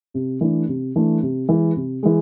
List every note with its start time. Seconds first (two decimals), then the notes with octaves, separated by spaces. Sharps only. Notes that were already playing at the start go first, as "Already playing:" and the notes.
0.14 C3
0.41 E3 A3 D4
0.68 C3
0.96 E3 A3 D4
1.22 C3
1.49 E3 G#3
1.76 C3
2.03 E3 G#3